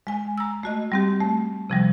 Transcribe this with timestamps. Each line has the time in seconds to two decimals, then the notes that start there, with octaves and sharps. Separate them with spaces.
0.07 G#3 G#5
0.38 A#5 E6
0.63 A3 F#4 D#5
0.92 G3 C4 G4
1.21 A3
1.70 C3 F3 G3